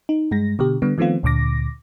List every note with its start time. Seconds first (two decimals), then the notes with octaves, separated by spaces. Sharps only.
0.09 D#4
0.31 G2 G#3 A#6
0.59 B2 D3 G4
0.82 D3 G3 B3
0.98 D#3 F3 A3 B3 C4 F4
1.23 D2 A#2 D3 D6 A#6